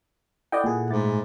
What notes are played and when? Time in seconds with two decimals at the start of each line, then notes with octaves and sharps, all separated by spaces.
0.52 E4 A4 D5 D#5 F#5 G5
0.64 A#2 G#4
0.90 G#2 A3 A6